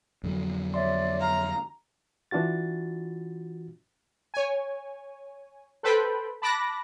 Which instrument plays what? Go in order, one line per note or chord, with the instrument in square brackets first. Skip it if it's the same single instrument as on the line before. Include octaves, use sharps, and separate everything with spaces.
[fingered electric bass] F2 D3 F#3
[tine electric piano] C#5 E5 C6 [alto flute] D5
[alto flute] F5 [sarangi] A#5
[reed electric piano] E3 D4 F4 F#4 A6
[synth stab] C#5 G#5
A4 B4 C5 G5 B5
A5 B5 D6 F#6 A#6